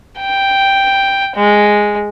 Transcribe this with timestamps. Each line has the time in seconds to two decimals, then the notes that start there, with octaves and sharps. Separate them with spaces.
0.19 G5
1.37 G#3